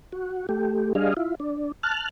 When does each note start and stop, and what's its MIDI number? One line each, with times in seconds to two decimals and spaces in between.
0.12 0.46 66
0.49 0.93 57
0.49 0.93 67
0.95 1.14 55
0.95 1.14 62
0.95 1.14 68
0.95 1.14 75
0.95 1.14 77
1.17 1.35 64
1.17 1.35 65
1.40 1.72 62
1.83 2.09 81
1.83 2.09 89
1.83 2.09 90